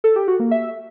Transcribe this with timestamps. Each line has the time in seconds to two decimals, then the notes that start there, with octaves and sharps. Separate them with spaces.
0.04 A4
0.16 G4
0.28 F#4
0.40 A#3
0.51 E5